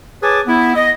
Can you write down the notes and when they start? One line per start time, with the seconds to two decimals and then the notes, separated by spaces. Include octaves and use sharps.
0.22 G#4 B4 C#5 G#5 A5 D6
0.47 B3 E4
0.76 D#5